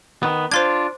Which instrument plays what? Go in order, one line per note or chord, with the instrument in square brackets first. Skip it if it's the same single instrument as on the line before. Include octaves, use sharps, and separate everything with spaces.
[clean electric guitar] D#3 B3
[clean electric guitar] D4 F4 [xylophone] C5 C6 G#6